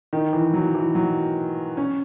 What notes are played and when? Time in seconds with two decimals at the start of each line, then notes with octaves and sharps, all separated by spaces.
0.13 D#3
0.33 E3
0.54 F#3
0.75 E3
0.95 F#3
1.77 C#4